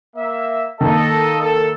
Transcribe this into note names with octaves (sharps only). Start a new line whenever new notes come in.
A#3 E5
D#3 A#3 A4 D#5
A4